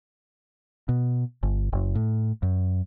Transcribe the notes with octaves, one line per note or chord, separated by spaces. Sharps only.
B2
G1
F#1
A2
F#2